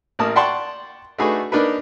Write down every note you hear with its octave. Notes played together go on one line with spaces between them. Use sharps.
A1 A#3 A5 D#6
D5 F#5 G5 A5 C6 C#6
A3 D4 D#4 F#4 G#4 B4
A#3 D4 D#4 A#4 B4